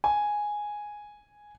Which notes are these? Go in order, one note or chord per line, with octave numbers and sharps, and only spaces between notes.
G#5